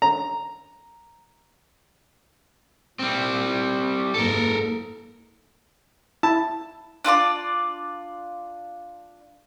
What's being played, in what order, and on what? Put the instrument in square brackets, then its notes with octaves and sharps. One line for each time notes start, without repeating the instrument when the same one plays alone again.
[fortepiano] A#5
[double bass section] A#2 [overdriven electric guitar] G3 C4
[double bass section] F#1 G#2 A#3 [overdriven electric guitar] A4 A#4
[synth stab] E4 [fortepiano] A5
[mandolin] D4 F4 A#4 D5